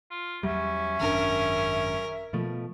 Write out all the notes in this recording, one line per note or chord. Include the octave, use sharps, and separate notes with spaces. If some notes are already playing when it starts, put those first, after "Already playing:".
F4
E2 F#3 G3 C#4 E5
G#1 F#2 D4 A#4
B2 F3 A3